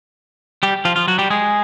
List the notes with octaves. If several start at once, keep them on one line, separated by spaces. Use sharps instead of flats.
G3 G4
F3 F4
F3 F4
F#3 F#4
G3 G4
G#3 G#4